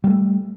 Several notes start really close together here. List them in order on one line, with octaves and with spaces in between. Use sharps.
G3 A#3 A3